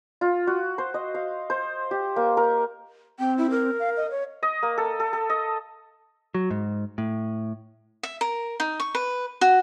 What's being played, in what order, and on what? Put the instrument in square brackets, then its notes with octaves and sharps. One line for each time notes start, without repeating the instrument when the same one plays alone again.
[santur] F4
F#4
C5
D#5
F5
C5
G4
A#3
A#4
[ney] C4 [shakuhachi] G5
[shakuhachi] E4
A#4
[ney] F5
D#5
C#5
[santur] D#5
A#3
A4
A4
A4
D#5
[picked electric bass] F#3
G#2
A2
[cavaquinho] E5
A#4
D#4
C#6
B4
F#4